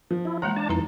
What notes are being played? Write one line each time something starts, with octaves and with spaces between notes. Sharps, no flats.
F3
E4
E3 G#3 A#3 F#5 A#5
D4 A5
F2 E3 D#4 A#5